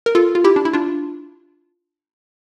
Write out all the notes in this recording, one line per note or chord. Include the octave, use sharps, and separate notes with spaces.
A#4
F4 A4
F4
E4 G4
D4
E4
D4 F4